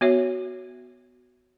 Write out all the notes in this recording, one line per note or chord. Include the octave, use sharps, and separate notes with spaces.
B3 F#4 C#5 E5